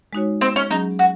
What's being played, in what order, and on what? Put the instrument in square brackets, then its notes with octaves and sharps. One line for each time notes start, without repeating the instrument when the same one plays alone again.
[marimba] G#3 D#4 F#4 C#5
[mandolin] C4
C#4
[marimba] F#3 C#4 G#4 [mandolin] D#4
[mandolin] F#4